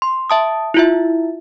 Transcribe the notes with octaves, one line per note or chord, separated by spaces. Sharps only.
C6
E5 A5 D#6
E4 F4 E5